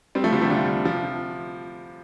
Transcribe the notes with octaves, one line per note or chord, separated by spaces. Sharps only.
G3 C4
F3 A3
D3 G3
C3 F3
D3 G3
C3 F3